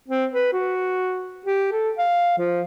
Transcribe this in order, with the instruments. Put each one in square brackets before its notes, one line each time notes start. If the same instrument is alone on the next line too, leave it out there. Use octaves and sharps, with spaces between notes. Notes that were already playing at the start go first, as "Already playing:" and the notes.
[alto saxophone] C4
B4
F#4
G4
A4
F5
F3